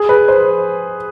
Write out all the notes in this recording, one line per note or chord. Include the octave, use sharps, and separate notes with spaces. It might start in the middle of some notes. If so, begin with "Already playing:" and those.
Already playing: G#4
B4
C5